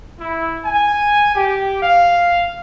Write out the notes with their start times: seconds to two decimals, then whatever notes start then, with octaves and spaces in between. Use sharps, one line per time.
0.19 E4
0.65 G#5
1.34 G4
1.82 F5